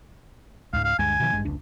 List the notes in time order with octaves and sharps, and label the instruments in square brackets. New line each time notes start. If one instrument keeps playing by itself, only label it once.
[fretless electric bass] C#2 G#2 [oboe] F5
[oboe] F5
[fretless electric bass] D2 G2 G#3 [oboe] G#5
[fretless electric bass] B2 D#3 F3
G#1 G2 G#3
F1 C#2 D4